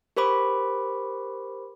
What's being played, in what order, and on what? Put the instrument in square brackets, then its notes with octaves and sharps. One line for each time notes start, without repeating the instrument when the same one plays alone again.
[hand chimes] G4 A#4 C5 B5 D6